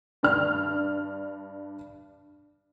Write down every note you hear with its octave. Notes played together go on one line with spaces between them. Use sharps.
G2 D4 F6